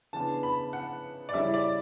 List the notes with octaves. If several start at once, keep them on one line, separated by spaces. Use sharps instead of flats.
C#3 E3 B3 D4 A5
B5
F#5
D5
C#3 G3 C#4 E4 E5
D5